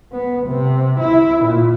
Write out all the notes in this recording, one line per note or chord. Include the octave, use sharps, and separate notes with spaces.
B3
C3
E4
A#2